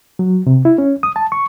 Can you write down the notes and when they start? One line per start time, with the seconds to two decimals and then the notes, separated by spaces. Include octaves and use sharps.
0.19 F#3
0.47 C3
0.65 E4
0.78 C#4
1.03 D#6
1.16 A5
1.32 C#6